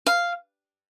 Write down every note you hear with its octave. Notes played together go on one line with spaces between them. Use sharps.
F5